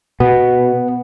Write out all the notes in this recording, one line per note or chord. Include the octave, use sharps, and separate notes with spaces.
B2 B3